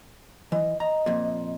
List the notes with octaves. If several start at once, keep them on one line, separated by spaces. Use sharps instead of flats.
E3 D#5
D#5 A#5
F2 A#2